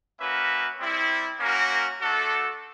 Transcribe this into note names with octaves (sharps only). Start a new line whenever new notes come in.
A#3 C#4 F#4 B4 E5
G3 C4 E4
A#3 C#4 F#4 A#4
A3 D4 F#4 A4